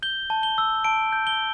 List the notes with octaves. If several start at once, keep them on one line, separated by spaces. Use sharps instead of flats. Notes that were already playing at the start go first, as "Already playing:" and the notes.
G6 G7
A5
G7
E6
A5 D7
G6
G7